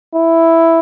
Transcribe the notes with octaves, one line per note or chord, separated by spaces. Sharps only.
E4